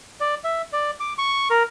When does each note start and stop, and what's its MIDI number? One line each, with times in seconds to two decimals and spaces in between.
0.20 0.35 74
0.44 0.62 76
0.73 0.91 74
1.00 1.14 86
1.18 1.48 85
1.50 1.63 70